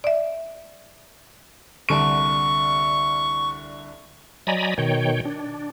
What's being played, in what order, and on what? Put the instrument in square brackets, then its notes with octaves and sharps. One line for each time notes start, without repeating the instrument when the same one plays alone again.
[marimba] D5 E5
[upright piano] C2 D3 D7 [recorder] C#6
[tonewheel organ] F#3 D5 D#5 G#5 A#5 B5
B2 D#3 C#5 G5
D4